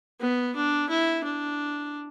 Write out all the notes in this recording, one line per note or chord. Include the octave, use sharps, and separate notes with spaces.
B3
D4
E4
D4